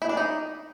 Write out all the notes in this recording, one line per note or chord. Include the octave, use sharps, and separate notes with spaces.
E4
D4
D#4